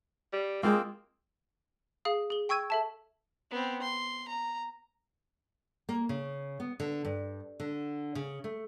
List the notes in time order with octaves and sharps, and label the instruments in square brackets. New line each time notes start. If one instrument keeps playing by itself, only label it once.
[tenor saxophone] G3
[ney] G#3 [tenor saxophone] A#3 [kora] C4 F4 C5
[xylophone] G#4 F5 D#6
G#4 G7
G5 C#6 E6 G#6 D#7
A4 E5 A5
[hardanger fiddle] B3 C4
C6
A#5
[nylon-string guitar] A#3
C#3
B3
D3
G2
D3
C#3
A3